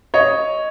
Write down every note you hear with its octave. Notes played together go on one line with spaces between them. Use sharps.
C#5 D#5